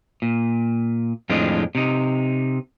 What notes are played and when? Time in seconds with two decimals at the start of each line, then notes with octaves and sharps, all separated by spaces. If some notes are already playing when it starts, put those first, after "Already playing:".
0.22 A#2
1.29 F2 A2 G#3 C4 D4 F4
1.75 C3 D#4